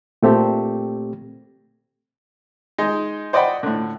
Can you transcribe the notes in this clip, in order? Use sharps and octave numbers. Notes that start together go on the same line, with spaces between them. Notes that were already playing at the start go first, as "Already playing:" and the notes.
A#2 A3 C4 G4
G#3 D#4
C5 D5 D#5 F#5 G5 B5
A2 D3